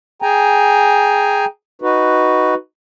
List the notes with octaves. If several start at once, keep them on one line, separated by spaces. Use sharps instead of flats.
G#4 G5 G#5 A#5
D#4 F#4 B4